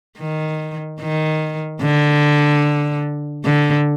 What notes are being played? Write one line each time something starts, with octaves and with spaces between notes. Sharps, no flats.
D#3
D#3
D3
D3